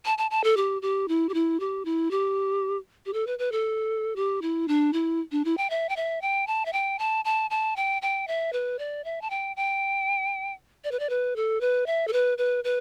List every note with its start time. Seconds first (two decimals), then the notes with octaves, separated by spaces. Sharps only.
0.05 A5
0.18 A5
0.31 A5
0.44 A4
0.57 G4
0.82 G4
1.08 E4
1.29 G4
1.34 E4
1.60 G4
1.85 E4
2.11 G4
3.06 G4
3.13 A4
3.27 B4
3.39 B4
3.52 A4
4.16 G4
4.42 E4
4.68 D4
4.93 E4
5.32 D4
5.45 E4
5.58 G5
5.70 E5
5.89 G5
5.96 E5
6.22 G5
6.47 A5
6.66 E5
6.73 G5
6.99 A5
7.25 A5
7.50 A5
7.76 G5
8.02 G5
8.28 E5
8.53 B4
8.79 D5
9.04 E5
9.22 A5
9.30 G5
9.56 G5
10.84 D5
10.91 B4
10.99 D5
11.10 B4
11.36 A4
11.61 B4
11.86 E5
12.08 A4
12.13 B4
12.38 B4
12.64 B4